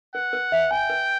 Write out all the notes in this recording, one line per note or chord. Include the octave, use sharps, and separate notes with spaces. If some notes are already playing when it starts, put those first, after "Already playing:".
B4 F#5
B4
E5
G5 G#5
B4